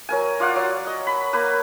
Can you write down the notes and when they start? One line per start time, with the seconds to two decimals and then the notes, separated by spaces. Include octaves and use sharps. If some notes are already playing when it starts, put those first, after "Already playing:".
0.09 F#3 A#4 G#5
0.40 F4 D5 F5 F#5
0.56 F#3
0.87 D#5
1.07 B5
1.33 A#3 B4